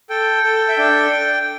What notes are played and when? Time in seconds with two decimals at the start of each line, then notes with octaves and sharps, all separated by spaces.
0.10 A4 G5
0.44 A4
0.68 E5
0.77 D4 G5